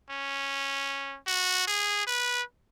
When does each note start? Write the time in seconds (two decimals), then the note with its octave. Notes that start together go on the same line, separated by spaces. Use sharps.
0.10 C#4
1.27 F#4
1.67 G#4
2.07 B4